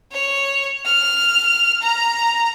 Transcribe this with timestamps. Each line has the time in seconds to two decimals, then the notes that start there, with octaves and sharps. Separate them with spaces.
0.12 C#5
0.85 F6
1.82 A#5